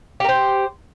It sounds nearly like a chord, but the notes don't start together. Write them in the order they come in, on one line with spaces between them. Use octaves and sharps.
G4 A#4 C5